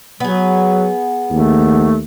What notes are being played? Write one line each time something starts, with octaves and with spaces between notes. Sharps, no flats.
F#3 B3 G#4
D#2 A3